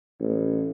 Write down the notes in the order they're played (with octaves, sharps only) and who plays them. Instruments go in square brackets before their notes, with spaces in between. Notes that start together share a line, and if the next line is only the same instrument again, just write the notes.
[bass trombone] A1